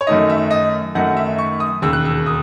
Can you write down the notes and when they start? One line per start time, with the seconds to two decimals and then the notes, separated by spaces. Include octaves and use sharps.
0.01 C#5
0.07 F#2 D#3 A3 D#4 D#5
0.30 E5
0.51 D#5
0.95 F#2 D#3 A3 D#4 F#5
1.17 E5
1.38 C#6
1.60 D#6
1.82 E1 D#2 C#3 E6
1.93 F#6
2.05 E6
2.26 D#6